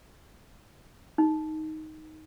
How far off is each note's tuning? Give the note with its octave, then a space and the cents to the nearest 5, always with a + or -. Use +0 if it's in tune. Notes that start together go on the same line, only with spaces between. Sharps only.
D#4 +5